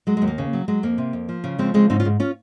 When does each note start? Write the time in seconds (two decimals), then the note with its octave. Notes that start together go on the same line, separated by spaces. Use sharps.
0.07 F#3 G#3
0.17 G#3
0.22 D#2
0.27 A#3
0.38 C#3
0.53 F#3
0.68 F#3 G#3
0.83 F2 A#3
0.98 C3
1.13 F2
1.29 F3
1.44 C#3
1.59 F3 G#3 C4
1.74 C#3 G#3 C4
1.90 G#2 C4 D#4
2.00 C#4 F4
2.05 G#2
2.20 C#4 F4